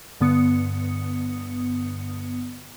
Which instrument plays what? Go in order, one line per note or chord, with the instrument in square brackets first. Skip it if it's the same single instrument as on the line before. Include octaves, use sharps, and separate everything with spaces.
[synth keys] G2 D3 B3 D#6 C#7